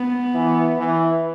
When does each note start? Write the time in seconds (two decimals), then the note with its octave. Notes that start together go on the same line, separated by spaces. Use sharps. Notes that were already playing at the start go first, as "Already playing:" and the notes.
Already playing: B3
0.35 E3
0.78 E3